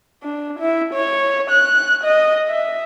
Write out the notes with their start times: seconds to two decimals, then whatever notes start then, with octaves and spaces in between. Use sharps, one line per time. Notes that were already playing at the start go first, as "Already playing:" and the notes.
0.23 D4
0.59 E4
0.94 C#5
1.50 F#6
2.04 D#5
2.48 E5